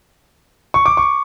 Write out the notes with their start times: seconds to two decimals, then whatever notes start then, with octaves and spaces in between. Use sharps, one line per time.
0.74 C#6
0.86 D6
0.97 C#6